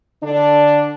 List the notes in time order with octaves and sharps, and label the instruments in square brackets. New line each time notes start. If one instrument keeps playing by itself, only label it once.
[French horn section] D3 D4